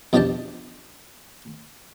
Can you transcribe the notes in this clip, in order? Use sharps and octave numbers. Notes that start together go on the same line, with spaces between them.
E2 B2 F3 D4 G4 A5